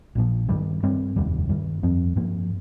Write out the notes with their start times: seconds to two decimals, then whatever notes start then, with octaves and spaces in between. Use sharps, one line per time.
0.15 A#1 A#2 F3
0.49 G2 D#3 G3
0.83 G2 G3 C4
1.16 F1 D#2 D#3 G3
1.49 G2 D#3 G3
1.83 F2 F3 C4
2.16 G2 F3 A#3